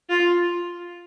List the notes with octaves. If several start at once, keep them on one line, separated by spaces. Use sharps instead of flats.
F4